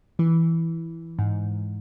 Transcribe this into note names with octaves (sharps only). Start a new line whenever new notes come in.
E3
G#2